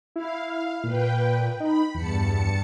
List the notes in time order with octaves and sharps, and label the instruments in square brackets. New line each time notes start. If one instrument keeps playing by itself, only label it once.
[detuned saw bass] E4 [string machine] F5
[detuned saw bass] A#2 [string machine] B4 G5
[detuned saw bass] D#4 [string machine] B5
[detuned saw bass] E2 [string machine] G2 A5 C#7